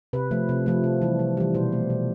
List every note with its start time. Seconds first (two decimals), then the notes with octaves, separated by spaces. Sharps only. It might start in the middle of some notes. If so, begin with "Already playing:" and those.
0.13 C3 B4
0.31 F3 A3
0.49 C3
0.66 F3 A3
0.84 C3
1.02 E3 G3
1.19 C3
1.37 E3 G3
1.54 B2 C5
1.72 A3
1.90 B2